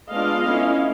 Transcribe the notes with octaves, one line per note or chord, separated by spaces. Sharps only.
G#3 B3 D4 F4 D#5 F5
A3 C#4 E4